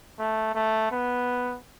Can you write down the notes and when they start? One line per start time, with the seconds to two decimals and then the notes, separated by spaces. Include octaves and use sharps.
0.19 A3
0.55 A3
0.92 B3